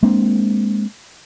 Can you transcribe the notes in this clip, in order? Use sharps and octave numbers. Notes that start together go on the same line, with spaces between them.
G#3 A#3 C4 D4